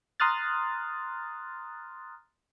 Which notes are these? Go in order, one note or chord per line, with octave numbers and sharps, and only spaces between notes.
A#5 C6 D#6 F6 F#6 A6